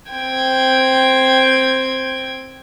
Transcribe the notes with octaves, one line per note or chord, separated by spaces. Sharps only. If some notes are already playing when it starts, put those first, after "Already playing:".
C4 G5 G#6